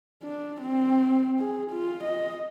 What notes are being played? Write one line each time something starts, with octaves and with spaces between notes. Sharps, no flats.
D4
C4
G#4
F4
D#5